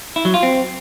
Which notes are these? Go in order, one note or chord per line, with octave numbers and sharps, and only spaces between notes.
E4
F#3
F4
C4